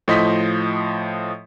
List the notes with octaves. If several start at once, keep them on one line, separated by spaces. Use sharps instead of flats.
A2 F3 D#5 C6 G6 B6